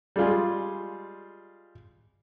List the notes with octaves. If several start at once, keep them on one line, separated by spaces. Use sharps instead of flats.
G3 G#3 F4 G#4